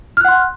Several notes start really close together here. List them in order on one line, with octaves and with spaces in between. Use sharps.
F6 F#6 F#5 C6